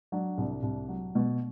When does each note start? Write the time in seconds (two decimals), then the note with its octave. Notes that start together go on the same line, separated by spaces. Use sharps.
0.12 F#3 D4
0.38 C2
0.63 C2
0.89 F#3
1.15 B2